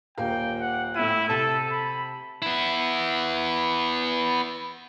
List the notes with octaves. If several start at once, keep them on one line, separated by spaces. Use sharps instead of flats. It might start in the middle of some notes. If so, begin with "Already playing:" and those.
D#1 A#3 G5
F#5
A2 E4 D#7
C3 A4 A5 D#7
B5
B3 E4